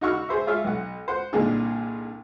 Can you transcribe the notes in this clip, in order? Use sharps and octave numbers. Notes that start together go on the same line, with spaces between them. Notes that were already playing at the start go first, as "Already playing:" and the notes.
D#4 F#4 F#5 C#6 E6 F6
G#4 C5 E5
F4 G#4 C#5 E5 F5
B1 F#5
C5 F#5
C2 A#2 D3 D#4 G#4